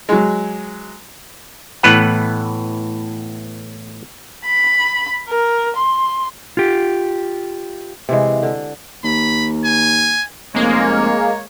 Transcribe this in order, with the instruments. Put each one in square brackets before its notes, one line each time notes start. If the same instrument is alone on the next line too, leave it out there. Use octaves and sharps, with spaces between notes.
[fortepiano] F#3 G#3
[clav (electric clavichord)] A2 E3 B3 B4 F#5
[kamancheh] B5
A#4
C6
[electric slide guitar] F4 G4
[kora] C3 E3 G#3
D3
[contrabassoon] D#2 [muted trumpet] B5
[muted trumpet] G#5
[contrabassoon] F1 [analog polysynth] G#3 A#3 [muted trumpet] C#5